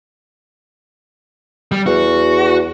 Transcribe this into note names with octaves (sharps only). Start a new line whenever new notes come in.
G3
E2 F#4